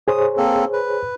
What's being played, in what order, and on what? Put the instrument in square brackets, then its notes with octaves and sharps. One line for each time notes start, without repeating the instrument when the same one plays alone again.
[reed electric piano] G#4 C5 C#5 [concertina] D#6
[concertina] A#3 C4 A4
B4